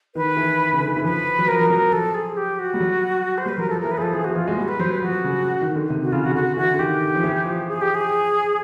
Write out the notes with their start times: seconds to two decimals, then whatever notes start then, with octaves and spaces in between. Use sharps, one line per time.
0.15 D#3 B4
0.37 E3
0.73 C#3
0.80 D3
0.88 D#3
0.96 E3
1.04 F3 B4
1.38 F#3
1.48 F3 A#4
1.59 F3
1.70 F#3 A#4
1.92 F3 A4
2.14 G#4
2.36 G4
2.59 F#4
2.74 G3
2.81 F#3
3.38 C5
3.46 G3 B4
3.58 F#3 A#4
3.69 F3 A4
3.80 E3 A#4
3.91 B4
3.97 F3 G#4 A4
4.13 E3 G#4
4.24 E3 F#4
4.35 F3 F4
4.46 G#3 F#4
4.58 G3 F#4
4.68 B4
4.79 F#3 C5
4.91 B4
5.02 F3 F#4
5.24 C#3
5.61 D#3
5.76 D3
5.90 C3
6.02 F#4
6.12 C#3 F4
6.24 C#3 F#4
6.35 D3 F#4
6.57 E3 F#4
6.74 D3
6.79 D#3 G4
7.15 F3
7.23 E3
7.45 F3
7.67 G#4
7.81 G4
7.94 G#4